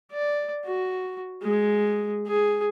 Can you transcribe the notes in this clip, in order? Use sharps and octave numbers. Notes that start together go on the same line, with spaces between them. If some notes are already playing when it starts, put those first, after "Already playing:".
D5
F#4
G#3
G#4